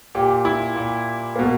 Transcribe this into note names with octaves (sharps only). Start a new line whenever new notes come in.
A#2 G4
E4
A#2
B2 A#3